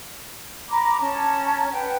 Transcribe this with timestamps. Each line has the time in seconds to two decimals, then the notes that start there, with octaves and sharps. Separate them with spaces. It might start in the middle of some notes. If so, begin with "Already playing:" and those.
0.70 A#5 B5 D6
1.00 C#4 A5 A#5
1.72 B4 F#5 G5